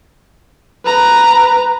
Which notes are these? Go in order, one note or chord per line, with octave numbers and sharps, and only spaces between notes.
B4 A#5